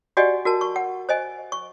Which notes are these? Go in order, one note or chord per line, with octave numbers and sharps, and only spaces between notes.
F#4 G4 D5 D#5 F#5 G#5
F#4 A#4 A5
C#6
F#5
C5 D#5 G#5
C#6